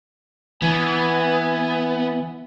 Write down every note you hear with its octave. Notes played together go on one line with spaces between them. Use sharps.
E3 B3 G#5